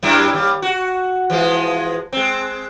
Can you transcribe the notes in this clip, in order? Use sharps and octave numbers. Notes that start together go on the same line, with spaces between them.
F#2 G3 E4
D#2 G3
F#4
E3 F3 G#3
G#3 C4